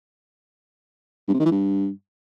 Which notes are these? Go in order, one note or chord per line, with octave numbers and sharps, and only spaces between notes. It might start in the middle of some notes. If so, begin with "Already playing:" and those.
G2
C3
D#3
E3
G2